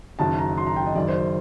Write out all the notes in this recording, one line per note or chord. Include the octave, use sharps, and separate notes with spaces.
F#1 F#2 D#3 A5
A#5
C6
A#5
G5
D#5
F#1 F#2 D#3 D5
C5